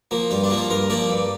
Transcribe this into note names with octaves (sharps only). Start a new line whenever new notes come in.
F3 A#3
G2 F4
D4
F3 A#3
F4
G2 A#4
F3 A#3 D5
G2